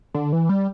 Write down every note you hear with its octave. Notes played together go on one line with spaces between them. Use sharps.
D3
E3
G3